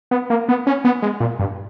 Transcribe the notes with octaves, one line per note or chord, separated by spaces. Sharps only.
B3
A#3
B3
C#4
B3
G#3
A#2
G2